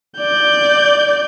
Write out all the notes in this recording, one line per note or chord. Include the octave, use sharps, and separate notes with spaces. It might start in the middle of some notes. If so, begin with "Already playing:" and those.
D5 G6